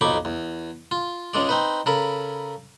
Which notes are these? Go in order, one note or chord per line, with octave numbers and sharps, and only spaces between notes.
B1 F2 D#4 B5 C#6 D6
E2
F4
C#2 C#3 G#3 D5
C4 D#4 B4
C#3 A4 A#4 B5